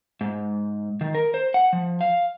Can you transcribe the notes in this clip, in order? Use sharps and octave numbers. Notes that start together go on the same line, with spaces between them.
G#2
D#3
A#4
C5
F#5
F3
F5